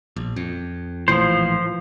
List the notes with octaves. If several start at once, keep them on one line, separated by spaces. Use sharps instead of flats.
A#1
F2
A#1 A2 E3 F3 C5